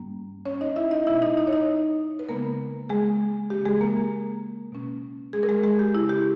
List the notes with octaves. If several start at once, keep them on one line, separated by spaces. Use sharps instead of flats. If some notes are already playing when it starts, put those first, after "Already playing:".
Already playing: G2 G3 A#3 C#4
C#4 C#5
D#4 D#5
E4 E5
D#4 D#5
B2 G#3 B3 E4 E5
D#4 D#5
D#4 D#5
C#5
D#4 D#5
B4
C#3 G#3 A#3 B3 A#4
G#3 G#4
C#3 E3 A#3 C#4 G4
G#3 G#4
A#3 A#4
B2 A#3 C#4
G#3 G#4
A#4
G#3 G#4
G#3 G#4
G4
C#3 G#3 C#4 E4
G4